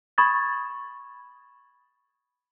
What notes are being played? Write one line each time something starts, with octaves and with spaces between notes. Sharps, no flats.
B5 C#6 D#6 G#6 A6